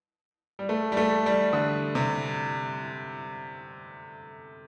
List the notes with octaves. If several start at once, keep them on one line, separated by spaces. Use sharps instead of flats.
G3
A3
G3
A3
G3
D3
C3